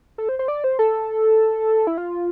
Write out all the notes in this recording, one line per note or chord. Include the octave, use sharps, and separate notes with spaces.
A4
C5
C5
D5
C5
A4
E4
F4